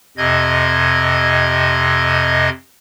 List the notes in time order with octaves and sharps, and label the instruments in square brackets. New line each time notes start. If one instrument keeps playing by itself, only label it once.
[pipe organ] F2 C3 D#5 G#6